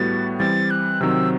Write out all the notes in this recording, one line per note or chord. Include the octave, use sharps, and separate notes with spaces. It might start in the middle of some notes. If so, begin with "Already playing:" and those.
Already playing: A2 G3 B3 F#4 A6
E3 G3 C4 A6
F#6
C3 D#3 F#3 C4 E6